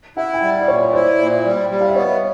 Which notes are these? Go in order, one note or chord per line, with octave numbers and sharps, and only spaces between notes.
E4 E5 F#5
G5
G3 E5 F#5
D5
A#2 C#5
E4 C5 D5
A#2
G3
G3
F5
E5
B3 C#5 D#5